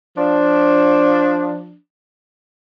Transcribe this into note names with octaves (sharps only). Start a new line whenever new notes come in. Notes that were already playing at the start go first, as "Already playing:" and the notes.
F3 D4